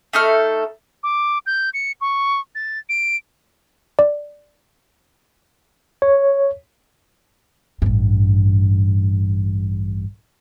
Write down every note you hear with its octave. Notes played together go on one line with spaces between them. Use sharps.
A3 D#4 A4 F6
D6
G6
C#7
C#6
A6
D7
D5
C#5
A1 G2